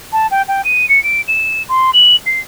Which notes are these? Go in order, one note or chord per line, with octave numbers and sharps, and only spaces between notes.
A5
G5
G5
D#7
C#7
D7
E7
C6
F#7
C7